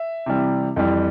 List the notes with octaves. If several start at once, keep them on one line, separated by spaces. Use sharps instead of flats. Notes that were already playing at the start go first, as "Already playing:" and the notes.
Already playing: E5
C3 E3 G3
F2 E3 G3